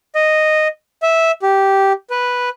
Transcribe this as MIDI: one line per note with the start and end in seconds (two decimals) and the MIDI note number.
0.15 0.68 75
1.02 1.32 76
1.42 1.92 67
2.10 2.49 71